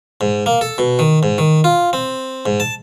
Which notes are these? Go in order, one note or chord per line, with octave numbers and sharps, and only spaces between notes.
G#2
A#3
A4
B2
D#3
G#2
D#3
F4
C4
G#2
A5